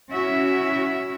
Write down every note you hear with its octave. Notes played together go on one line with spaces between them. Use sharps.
C#4 E4 F#4 E5